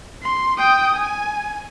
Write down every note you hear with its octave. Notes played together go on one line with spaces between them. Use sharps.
C6
G5 D#6
G#5